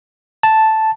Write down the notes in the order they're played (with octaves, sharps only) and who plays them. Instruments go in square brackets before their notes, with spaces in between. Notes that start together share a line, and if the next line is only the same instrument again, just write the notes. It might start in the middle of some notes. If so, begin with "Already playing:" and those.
[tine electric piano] A5